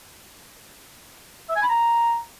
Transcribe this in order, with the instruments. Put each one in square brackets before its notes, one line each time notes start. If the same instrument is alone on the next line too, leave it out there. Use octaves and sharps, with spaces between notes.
[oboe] E5
G#5
B5
A#5